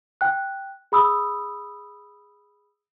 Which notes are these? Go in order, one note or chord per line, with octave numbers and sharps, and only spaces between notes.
G5 F#6
G#4 B5 D#6 E6